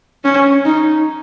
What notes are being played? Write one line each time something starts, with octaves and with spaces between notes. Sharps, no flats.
C#4
D#4